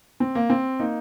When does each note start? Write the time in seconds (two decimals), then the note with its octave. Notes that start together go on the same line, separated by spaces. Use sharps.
0.20 C4
0.35 A#3
0.50 C4
0.79 A#3 D#4